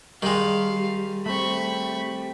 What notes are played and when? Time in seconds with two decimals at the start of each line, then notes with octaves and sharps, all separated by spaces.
0.22 D#3 G3 G#3 F5
1.26 A3 C4 B5 C#6